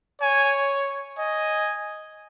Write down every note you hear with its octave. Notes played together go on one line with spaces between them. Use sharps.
C#5 G#5
D#5 G#5